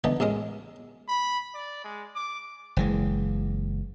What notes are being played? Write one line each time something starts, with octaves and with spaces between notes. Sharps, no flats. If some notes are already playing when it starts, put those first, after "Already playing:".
D3 E3 B3 D#4
A1 A2 G#3 A#4
B5
D5
G#3
D6
F#1 E3 G#3